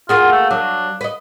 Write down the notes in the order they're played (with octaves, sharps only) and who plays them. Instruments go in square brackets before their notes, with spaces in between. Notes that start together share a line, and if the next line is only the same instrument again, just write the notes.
[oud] A#3 F#4 G#4 [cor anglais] F4
[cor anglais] A3
[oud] F#3 [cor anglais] D4
[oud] B4 D#5